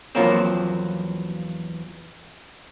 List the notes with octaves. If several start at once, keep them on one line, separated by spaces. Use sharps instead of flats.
E2 F3 F#3 A#3 C4